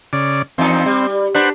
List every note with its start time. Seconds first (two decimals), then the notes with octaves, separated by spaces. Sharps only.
0.13 C#3 D5
0.58 E2 C4 D#4
0.86 G3
1.35 D4 B4 C5 F#5